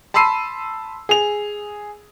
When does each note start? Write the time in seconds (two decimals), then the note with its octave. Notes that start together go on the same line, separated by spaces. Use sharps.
0.14 A5 B5 C6 E6 C7 D#7
1.09 G#4 F7